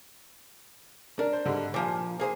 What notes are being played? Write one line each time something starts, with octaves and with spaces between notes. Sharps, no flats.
D4 A#4
C5
G#2 D3 G3
A#2 F3 G#5 D6
A#3 G#4 C5